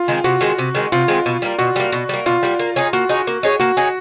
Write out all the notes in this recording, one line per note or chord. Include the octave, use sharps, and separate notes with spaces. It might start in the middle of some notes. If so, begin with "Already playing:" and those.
Already playing: F4
D#3 G#3 C4
C3 F#4
D#3 G#3 C4
C3
D#3 G#3 C4
C3 F4
D#3 G#3 C4
B2
G3 A#3
B2 F#4
G3 A#3
B2
G3 A#3
B2 F4
G3 A#3
A#3
D#4 G#4 C#5
A#3 F#4
D#4 G#4 C#5
A#3
D#4 G#4 C#5
A#3 F#4
D#4 G#4 C#5